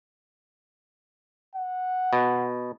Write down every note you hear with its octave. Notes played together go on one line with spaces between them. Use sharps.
F#5
B2